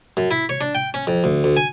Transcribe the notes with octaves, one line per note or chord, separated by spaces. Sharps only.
F#2
E4
C#5
D4
G5
C#4
F2
D2
D2
G#5